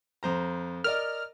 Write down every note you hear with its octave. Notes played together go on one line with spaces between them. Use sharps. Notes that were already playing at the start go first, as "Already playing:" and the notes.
F2 C5 A#5
A#4 D5 D#5 F6